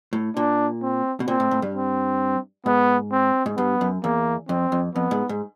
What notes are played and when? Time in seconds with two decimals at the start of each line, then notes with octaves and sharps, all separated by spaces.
0.13 A2
0.36 A#2 D4
0.82 C4
1.20 B2
1.28 A#2 C4
1.40 A2
1.51 A2
1.62 G2
1.74 C4
2.66 G#2 B3
3.12 C4
3.46 G#2
3.57 G2 B3
3.81 F#2
4.03 E2 A#3
4.49 F2 C4
4.72 F2
4.95 F2 B3
5.11 G#2
5.29 G#2